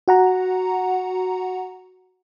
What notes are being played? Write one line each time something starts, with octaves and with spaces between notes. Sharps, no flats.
F#4 F#5 A#5